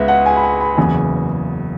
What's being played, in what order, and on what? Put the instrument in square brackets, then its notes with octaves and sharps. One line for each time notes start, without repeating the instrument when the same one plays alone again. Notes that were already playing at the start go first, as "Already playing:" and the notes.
Already playing: [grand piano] C#2 G#3 B3 E5
F#5
G#5
B5
G#5
B5
F#1 E2 C#3 G#5